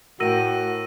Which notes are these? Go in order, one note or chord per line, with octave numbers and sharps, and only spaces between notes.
A2 F#4 A#4 G5 E6 A#6 D#7